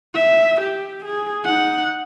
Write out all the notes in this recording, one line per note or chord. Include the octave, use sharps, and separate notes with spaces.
E5
G4
G#4
D#4 F#5